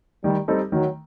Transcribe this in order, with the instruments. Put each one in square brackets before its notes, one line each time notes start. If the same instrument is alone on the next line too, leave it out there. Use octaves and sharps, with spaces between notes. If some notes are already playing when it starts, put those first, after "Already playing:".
[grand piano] D#3 [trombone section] G3
[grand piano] G3 C4 D#4 A4
[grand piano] D#3 [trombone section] F#3